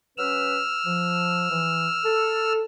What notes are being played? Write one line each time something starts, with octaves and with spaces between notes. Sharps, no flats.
F#3 C#4 B4 E6 F6
F3
E3
A4